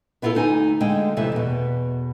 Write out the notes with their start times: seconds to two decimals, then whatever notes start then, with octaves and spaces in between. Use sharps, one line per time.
0.22 B3 E4 F4 G#4 A4
0.35 D2 D#4 G#5
0.80 D3 G#3 F4 G5
1.17 D#2 C3 E3 A4 E5
1.32 E2 B2